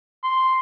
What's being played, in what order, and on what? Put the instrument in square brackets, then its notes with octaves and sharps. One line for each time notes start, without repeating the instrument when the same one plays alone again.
[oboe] C6